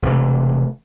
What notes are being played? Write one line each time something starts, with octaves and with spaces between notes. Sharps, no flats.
E1 C3 E3 A3